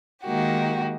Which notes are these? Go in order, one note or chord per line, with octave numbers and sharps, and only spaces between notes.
D#3 G#3 A#3 F#4 G4